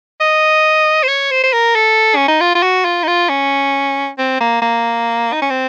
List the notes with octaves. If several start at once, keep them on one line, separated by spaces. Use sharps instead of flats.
D#5
C5
C#5
C5
C5
A#4
A4
C#4
D#4
F4
F4
F#4
F4
D#4
F4
C#4
C4
A#3
A#3
D#4
C#4
C4